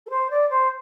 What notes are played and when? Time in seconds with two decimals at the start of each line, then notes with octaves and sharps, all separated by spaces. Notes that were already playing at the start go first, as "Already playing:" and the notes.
0.06 A4
0.09 C5
0.30 D5
0.50 C5